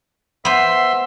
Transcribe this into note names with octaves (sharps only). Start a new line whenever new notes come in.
B3 C5 E5 C6 E6